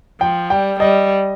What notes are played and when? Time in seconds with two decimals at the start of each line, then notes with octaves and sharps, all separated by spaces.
0.20 F3 G5
0.50 G3 G5
0.80 G3 D#5